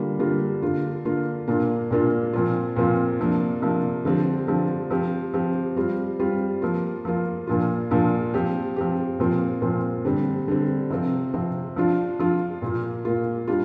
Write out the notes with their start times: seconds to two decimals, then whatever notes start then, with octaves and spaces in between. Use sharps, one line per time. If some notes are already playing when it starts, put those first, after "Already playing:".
Already playing: D3 G3 A#3 F4
0.19 D3 G3 A#3 F4
0.62 D3 A#3 F4
1.05 D3 A#3 F4
1.48 A#2 A#3 D4 F4
1.91 A#2 A#3 D4 F4
2.33 A#2 F3 C4 F4
2.76 A#2 F3 C4 F4
3.20 C3 F3 A#3 D4
3.62 C3 F3 A#3 D4
4.05 D3 F3 C4 G4
4.47 D3 F3 C4 G4
4.91 F3 C4 G4
5.34 F3 C4 G4
5.76 G3 C4 F4
6.20 G3 C4 F4
6.62 F3 A#3 F4
7.05 F3 A#3 F4
7.47 A#2 F3 D4 F4
7.90 A#2 F3 D4 F4
8.34 F3 C4 G4
8.76 F3 C4 G4
9.19 A#2 F3 C4 F4
9.62 A#2 F3 C4 F4
10.05 D3 G3 C4
10.48 D3 G3 C4
10.90 C3 F3 C4
11.34 C3 F3 C4
11.76 F3 D4 F4
12.19 F3 D4 F4
12.62 A#2 A#3 F4
13.05 A#2 A#3 F4
13.47 G3 D4 F4